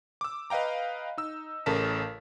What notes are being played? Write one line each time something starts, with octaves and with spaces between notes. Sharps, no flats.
D6 E6
B4 D#5 F5 G5 A#5
D#4 E6
A1 C#3 A4 A#4 A5 B6